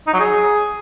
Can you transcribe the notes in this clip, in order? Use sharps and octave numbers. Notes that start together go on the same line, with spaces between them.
D#4
F#3
G#4